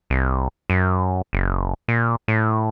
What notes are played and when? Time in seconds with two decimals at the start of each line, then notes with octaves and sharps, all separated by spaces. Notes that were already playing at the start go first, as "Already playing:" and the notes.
0.10 C2
0.70 F#2
1.33 F#1
1.88 A#2
2.28 A2